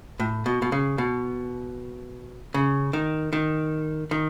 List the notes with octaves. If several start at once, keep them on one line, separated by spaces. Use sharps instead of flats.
A2
B2
B2
C#3
B2
C#3
D#3
D#3
D#3